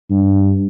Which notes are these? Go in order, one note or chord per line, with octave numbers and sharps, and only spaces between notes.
G2